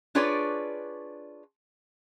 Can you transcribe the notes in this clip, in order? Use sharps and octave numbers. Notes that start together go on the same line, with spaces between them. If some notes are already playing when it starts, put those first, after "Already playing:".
D4 F4 G#4 B4 C#5 D5